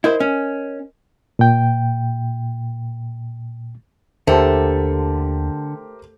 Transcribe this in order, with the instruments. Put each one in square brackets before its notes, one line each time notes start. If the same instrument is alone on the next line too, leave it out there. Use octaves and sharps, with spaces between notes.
[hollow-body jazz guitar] E4 C5 [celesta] A#4 D#5
[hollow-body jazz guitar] C#4
[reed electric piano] A#2 G5
[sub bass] D#2 [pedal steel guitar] D3 [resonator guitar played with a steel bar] A3 [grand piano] G4 A#4 C5